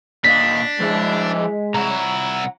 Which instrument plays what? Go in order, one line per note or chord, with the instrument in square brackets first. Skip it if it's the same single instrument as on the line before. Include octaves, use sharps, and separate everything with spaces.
[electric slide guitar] A#2 D#5 F5 [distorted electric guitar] D4 [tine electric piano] B6
[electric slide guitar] F3 E4 [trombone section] G#3
[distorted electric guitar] C2 E4 [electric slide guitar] F#5 A#5